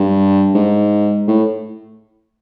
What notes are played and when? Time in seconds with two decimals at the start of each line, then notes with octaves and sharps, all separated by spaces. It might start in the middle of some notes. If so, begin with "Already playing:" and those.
Already playing: G2
0.55 G#2
1.28 A2